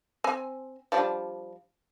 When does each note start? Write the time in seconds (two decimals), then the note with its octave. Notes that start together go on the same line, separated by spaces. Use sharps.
0.24 C4 G#5
0.92 F3 G3 D4